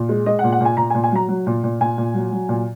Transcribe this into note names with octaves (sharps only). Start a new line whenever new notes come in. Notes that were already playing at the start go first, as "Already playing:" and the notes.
Already playing: A#2
G#3
G#3 D#5
F#5
A#2
F#5
A#2 G#5
A#2 A#5
G#5
A#2
G#5
F#3 A#5
F#3
A#2
A#2
A#2 G#5
A#2
F#3
F#3
A#2